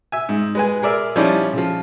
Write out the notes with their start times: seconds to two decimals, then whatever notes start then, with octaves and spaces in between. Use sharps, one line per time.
0.12 E5 G#5
0.29 G#2
0.55 G#3 B4 G#5
0.83 G#4 A#4 D5 E5
1.16 F3 G3 C#4 D#4 E4 D5
1.53 C#3 F3